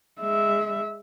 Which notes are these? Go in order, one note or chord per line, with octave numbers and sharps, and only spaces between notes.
G#3 E5